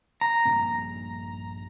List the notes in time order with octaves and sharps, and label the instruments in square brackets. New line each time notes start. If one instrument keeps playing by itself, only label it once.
[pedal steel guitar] A#5
[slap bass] A#1 G2 A#3